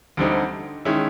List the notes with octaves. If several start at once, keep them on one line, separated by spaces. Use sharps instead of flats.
D2 D3 G3 C4 D#4
D#3 G#3 C#4 E4